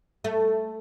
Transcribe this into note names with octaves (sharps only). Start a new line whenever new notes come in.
A3